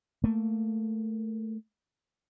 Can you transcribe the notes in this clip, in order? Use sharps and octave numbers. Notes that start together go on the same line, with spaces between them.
A3 A#3